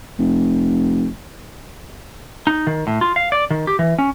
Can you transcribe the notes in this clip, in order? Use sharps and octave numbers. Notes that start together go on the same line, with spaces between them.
F1
D#4
D#3
A2
F4
F5
D5
D#3
G4
E3
C#4